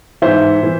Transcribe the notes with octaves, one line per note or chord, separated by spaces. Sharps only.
G#2 E3 C5 E5
E3